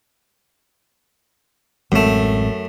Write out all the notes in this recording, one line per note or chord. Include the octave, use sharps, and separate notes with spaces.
A1 F#2 G#3 A3 C4